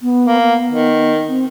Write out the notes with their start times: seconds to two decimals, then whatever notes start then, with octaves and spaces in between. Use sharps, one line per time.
0.02 B3
0.26 A#3
0.42 B3
0.69 D#3
1.29 C4